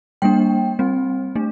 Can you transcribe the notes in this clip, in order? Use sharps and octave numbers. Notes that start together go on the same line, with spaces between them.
G3 A#3 D4 G5
G3 C4
A3 D4